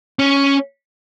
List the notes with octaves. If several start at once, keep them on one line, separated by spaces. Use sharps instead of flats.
C#4